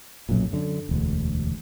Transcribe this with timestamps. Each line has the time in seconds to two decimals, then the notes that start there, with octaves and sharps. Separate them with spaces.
0.29 B1 F#2 A#2
0.52 F#2 D3
0.89 E1 D2